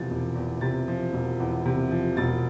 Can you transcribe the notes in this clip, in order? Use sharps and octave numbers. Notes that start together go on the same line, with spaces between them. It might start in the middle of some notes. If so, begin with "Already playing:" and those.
Already playing: E1 E2 C3 F3 A6
E1
E2
C3 A6
F3
E1
E2
C3
F3
E1 A6